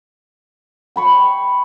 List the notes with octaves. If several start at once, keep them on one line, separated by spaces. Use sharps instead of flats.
G5 B5 C#6